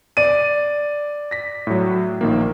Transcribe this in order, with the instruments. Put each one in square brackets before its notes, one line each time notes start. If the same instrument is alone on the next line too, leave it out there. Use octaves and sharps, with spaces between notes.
[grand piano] D5 D#7
[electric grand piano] A#6 B6
A2 F#3
A#1 D#3 A#3